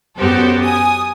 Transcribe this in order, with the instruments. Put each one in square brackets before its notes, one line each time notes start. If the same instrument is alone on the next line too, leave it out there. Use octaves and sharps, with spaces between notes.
[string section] F#2 B3 F#4 G4 A4 C5
G#5 D#6